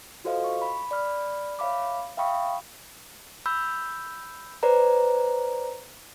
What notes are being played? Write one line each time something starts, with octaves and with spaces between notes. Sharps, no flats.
F4 F#4 A4 C5 D#5 F5
C#6
B5
D5 B5 F6
C#5 E5 F5 B5 D6
E5 F5 G5 B5 C#6 D#6
B5 E6 G6
B4 C5 D5 A#5